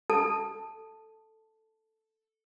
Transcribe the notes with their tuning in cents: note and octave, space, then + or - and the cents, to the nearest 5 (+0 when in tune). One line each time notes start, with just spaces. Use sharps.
A4 +0 A5 +0